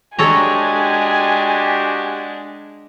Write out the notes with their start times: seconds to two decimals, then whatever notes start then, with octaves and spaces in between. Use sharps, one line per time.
0.19 G#3 D4 F#4 G4 A4 C#5 G#5 A#5